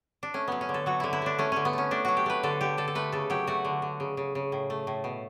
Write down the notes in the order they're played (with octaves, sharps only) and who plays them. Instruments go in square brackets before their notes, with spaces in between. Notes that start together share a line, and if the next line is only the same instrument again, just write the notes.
[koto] D4
A3 C#4
F#3 B3
C#4
D3
A4
F#3 F#4
D3 E4
E4
A3 D4
A3 C#4
D3 C#4
B3
A3 C#4
A3 D4
F#3 F#4
G4
A3 B4
D3 A4
D3 G4
D3 A4
A4
A3 B4
C#3 A4
F#3 G4
A3 F#4
D3
D3
C#3
C#3
C#3
A2
A3
A2
B2